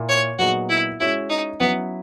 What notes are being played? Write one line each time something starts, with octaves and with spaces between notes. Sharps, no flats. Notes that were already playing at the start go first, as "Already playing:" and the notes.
Already playing: A#2 A#3 E4
C#5
A#2 F#3 B3 D#4 F#4 G#4
E4
G#3 C#4 E4 F#4 C#5 E5
D#4
F#3 B3 C#4 E4 B4